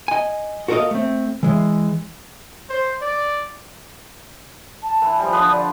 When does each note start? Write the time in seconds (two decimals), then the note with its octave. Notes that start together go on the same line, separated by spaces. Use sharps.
0.08 D#5 G#5
0.68 F#4 A4 A#4 D5 D#5 F5
0.91 A3 C4
1.43 E3 G#3
2.69 C5
3.02 D5
4.83 A5
5.02 E3
5.19 F3 G3
5.33 D3 F3 B4 D#6
5.52 D5